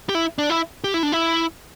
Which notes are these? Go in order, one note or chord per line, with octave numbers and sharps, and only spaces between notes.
G4
E4
D4
E4
G4
E4
D4
E4